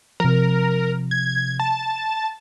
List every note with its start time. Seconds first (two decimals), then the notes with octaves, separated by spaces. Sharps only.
0.20 C3 F3 A#4
1.11 G#6
1.60 A5